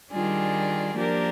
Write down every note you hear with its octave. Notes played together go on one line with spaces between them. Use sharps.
D#3 G3 D4 F4 G#4
F3 A#3 D4 G4 A#4